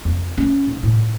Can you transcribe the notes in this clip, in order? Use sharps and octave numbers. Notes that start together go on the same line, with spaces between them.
F2
C#4
G#2
A2